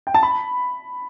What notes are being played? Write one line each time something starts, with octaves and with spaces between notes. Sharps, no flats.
G5
A5
B5